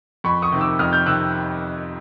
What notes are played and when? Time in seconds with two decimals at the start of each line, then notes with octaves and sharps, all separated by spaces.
0.24 F2 B5 C#6
0.42 C#6 D#6
0.52 C3 D#3
0.61 D6 E6
0.79 F2 D#6 F6
0.93 F6 G6
1.06 C3 D#3 E6 F#6